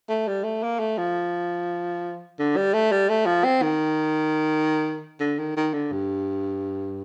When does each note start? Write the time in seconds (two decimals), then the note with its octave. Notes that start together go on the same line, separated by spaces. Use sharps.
0.09 A3
0.28 G3
0.44 A3
0.63 A#3
0.80 A3
0.98 F3
2.39 D3
2.57 G3
2.74 A3
2.92 G3
3.09 A3
3.26 F3
3.45 C4
3.62 D#3
5.20 D3
5.39 D#3
5.57 D#3
5.73 D3
5.92 G2